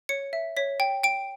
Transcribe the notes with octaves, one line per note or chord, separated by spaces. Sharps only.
C#5 C#7
E5
C#5 B6
G5
G5 D7